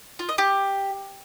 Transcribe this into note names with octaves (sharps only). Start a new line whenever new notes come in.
F4
D#5
G4